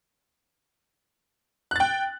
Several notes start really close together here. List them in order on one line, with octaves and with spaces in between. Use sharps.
F#6 A6 G5